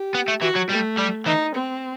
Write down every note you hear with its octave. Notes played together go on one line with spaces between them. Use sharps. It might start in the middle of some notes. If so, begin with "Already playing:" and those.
Already playing: G4
B3
A3
E3 F#4
F#3
G3 A3
G3
E3 D#4
C4